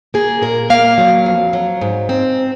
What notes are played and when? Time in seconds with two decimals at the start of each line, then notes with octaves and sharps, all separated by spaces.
0.14 A#3 G#4
0.42 A#2 A#4
0.70 A#3 F5
0.98 F#3
1.26 F2
1.53 F#3
1.81 G#2
2.09 C4